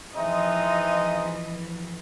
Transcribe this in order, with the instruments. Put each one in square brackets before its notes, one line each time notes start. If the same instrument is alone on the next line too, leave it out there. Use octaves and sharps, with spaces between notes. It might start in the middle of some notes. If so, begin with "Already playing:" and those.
[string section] E3 F3 [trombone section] G#3 C4 D#4 [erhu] D#5 [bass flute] E5